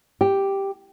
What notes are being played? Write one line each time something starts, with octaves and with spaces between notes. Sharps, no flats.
G4